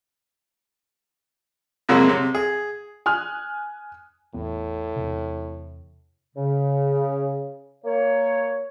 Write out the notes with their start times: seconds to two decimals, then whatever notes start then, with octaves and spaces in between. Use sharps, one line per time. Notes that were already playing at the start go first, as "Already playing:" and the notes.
1.89 C2 F2 C3 F#3 G#3 A#3
2.09 C3
2.35 G#4
3.06 G#5 D#6 F6 F#6
4.34 A1 E2 A2 B3
4.96 E2 C3
6.36 C#3
7.85 A#3 C#5